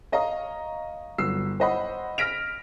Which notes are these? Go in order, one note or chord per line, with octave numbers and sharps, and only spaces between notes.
C#5 D#5 F5 A#5
G1 F#3 E6 C7
C5 C#5 D#5 F#5 B5
F6 A#6 B6 D7 F7